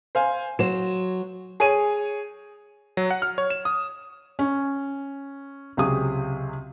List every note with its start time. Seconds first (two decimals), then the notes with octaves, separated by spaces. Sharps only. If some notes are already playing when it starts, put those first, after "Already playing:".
0.15 C5 F5 G#5
0.59 F#3 C5 E7
1.60 G#4 C#5 D#7
2.97 F#3
3.11 F#5
3.22 F6
3.38 C#5
3.50 E7
3.65 D#6
4.39 C#4
5.77 C#2 C3 F#3 G4 G#4 D#6